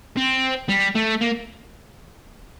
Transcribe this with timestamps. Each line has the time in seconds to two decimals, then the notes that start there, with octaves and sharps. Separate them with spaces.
0.17 C4
0.69 G3
0.96 A3
1.21 A#3